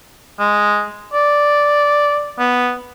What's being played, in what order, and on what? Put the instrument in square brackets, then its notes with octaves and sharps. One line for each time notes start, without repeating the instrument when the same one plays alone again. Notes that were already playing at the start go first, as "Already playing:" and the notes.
[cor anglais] G#3
D5
B3